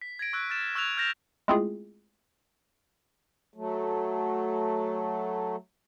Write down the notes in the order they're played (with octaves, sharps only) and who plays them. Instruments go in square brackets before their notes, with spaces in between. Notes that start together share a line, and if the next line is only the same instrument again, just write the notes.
[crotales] B6
G#6 A#6 D7
C#6 E6 F#6
F6 A6 E7
C#6 E6 F#6 G#6 F7
F6 G6 A#6 E7 F7
[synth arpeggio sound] G#3 A3 C4 E4 F4 G#4
[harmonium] F#3 A3